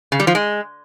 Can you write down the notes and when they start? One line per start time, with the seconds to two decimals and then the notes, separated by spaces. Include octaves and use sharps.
0.12 C#3
0.20 G3
0.27 F3
0.35 G#3